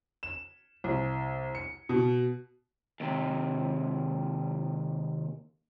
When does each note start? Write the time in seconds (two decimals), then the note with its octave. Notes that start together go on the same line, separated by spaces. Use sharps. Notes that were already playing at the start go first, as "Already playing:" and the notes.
0.23 E7
0.84 C2
1.55 C#7
1.89 B2
3.00 D#2 C3